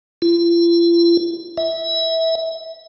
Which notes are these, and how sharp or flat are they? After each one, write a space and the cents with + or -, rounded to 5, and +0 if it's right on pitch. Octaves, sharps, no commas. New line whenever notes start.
F4 -45
E5 -20